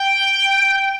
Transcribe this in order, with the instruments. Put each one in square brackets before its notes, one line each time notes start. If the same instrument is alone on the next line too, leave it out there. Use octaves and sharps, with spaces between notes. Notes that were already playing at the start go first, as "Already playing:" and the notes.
Already playing: [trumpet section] G5